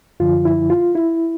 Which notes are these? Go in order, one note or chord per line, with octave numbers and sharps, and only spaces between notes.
F#2 D3 F3 F4
E4
F4
E4